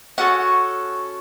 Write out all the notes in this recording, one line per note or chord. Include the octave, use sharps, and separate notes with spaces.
C#4 F#4 A4 F#5